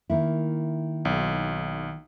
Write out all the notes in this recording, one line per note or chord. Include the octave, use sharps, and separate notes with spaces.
D#3 A#3 E4
B1